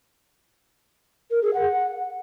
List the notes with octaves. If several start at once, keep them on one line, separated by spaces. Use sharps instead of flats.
A#4
G#4
F#5